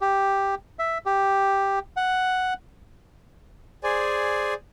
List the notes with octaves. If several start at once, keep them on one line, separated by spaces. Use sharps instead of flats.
G4
E5
G4
F#5
G#4 C5 D5 G#5